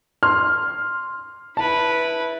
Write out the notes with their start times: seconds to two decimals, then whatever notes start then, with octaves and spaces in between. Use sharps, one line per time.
0.23 C6 F6
1.57 E4 B4 A5